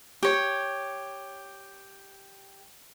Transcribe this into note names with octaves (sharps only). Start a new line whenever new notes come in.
G4 C#5